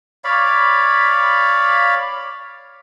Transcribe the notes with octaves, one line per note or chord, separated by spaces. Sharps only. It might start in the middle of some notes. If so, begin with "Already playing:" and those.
C#5 D5 F5 B5